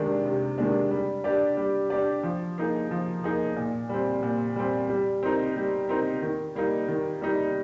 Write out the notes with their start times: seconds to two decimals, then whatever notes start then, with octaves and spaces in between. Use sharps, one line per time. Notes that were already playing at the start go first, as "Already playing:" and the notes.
Already playing: C3 D#3 G#3 D4
0.25 C3
0.58 D#3 G#3 D4
0.91 G3
1.24 D4 G4 D5
1.57 G3
1.90 D4 G4 D5
2.23 F3
2.58 A#3 D#4 G#4
2.91 F3
3.24 A#3 D#4 G#4
3.56 A#2
3.89 G3 C4
4.23 A#2
4.56 G3 C4
4.90 G3
5.23 C4 D#4 A#4
5.56 G3
5.89 C4 D#4 A#4
6.22 D#3
6.55 G3 A#3 D#4
6.88 D#3
7.22 G3 A#3 D#4